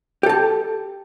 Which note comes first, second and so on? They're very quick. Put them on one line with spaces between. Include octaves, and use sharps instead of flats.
G4 A4 A5